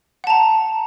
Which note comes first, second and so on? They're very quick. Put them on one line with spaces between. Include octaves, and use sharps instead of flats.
F#5 A5 A#5